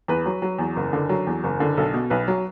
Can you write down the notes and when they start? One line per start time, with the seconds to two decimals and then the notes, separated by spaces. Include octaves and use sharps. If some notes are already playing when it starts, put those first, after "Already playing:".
0.08 E2 B4
0.26 F#3
0.42 F#3
0.59 E2
0.76 F#1
0.93 D3
1.09 F#3
1.27 E2
1.44 F#1
1.60 D3
1.77 B1 A4
1.94 B2
2.10 B1 B4
2.28 F#3